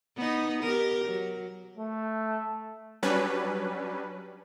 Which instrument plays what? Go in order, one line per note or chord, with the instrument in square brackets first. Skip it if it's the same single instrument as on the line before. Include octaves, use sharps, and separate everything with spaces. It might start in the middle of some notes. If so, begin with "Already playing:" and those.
[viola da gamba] B3 D#4
G4 A#4
F#3
[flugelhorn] A3
[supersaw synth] F#3 G3 C#4 D4 B4